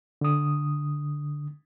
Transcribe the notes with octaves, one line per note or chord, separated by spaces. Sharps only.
D3 D#6